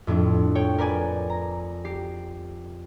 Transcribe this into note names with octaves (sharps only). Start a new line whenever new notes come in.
F2 A2 C4 D4
C#5 G5
A#4 B4 D5 G#5
A#5
G4 C7